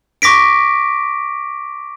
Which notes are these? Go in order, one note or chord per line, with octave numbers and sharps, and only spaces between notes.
C#6 D6 A#6 B6 D7